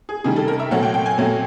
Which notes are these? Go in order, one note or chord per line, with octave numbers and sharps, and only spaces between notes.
G#4
C3 D#3 G3 G#4
A4
A#4
E5
A#2 F#3 A3 C4 F#5
G5
G5
G#5
A#2 F#3 A3 C4